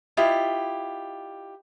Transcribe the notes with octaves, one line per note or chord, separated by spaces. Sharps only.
E4 F4 G4 D#5